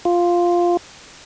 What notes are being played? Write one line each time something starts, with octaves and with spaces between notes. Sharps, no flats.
F4